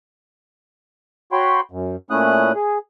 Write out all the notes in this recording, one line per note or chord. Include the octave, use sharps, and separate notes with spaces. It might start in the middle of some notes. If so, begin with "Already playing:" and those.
F#4 C#5 G5 B5 C6
F#2
A#2 A3 C#4 E4 D#6 F#6
G#4